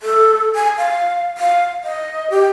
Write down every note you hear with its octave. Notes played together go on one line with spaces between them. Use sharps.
A4
G#5
F5
F5
D#5
G4